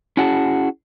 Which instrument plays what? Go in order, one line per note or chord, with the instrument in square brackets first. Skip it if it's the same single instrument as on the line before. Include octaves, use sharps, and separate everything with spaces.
[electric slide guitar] C#4 E4 F#4 G#4 A5